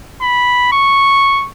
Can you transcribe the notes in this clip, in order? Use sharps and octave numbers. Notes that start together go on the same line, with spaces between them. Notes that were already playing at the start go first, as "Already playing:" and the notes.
B5
C#6